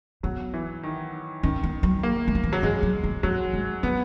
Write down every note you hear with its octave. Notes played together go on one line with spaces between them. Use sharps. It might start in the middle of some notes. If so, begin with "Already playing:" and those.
F#3 B3
E3
D#3
D#3 C#4
B3
F#3
A#3
G#3
F#3
E3
F#3
E3 G#3
F#3
B3
F#3 A#3
G#3
F#3 B3